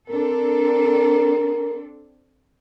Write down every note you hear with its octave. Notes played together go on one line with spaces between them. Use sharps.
C4 D4 A4 A#4